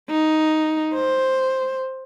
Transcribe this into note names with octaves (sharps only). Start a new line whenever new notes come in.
D#4
C5